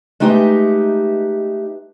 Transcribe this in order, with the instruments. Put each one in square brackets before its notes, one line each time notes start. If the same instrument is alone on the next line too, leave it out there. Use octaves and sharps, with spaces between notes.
[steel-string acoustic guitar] G#3 A3 D#4 G4 B4 E5